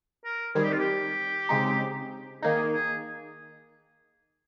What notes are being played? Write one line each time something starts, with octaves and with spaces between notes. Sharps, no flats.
A#4
D#3 G3 C4 D#4 G#4
G4
F4
G4
C#3 G#3 C4 D#4
D#3 A#3 D#4 G#4
G#4